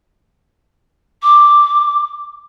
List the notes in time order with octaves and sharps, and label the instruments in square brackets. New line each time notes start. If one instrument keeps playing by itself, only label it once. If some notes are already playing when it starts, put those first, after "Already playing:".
[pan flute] D6